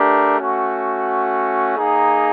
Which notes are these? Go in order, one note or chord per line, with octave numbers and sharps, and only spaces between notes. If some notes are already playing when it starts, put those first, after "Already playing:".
Already playing: A3 D4 G4 A#4
A3 C#4 F#4
A#3 D#4 G#4